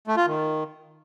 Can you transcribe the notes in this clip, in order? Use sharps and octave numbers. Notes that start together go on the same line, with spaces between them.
A3
F4
D#3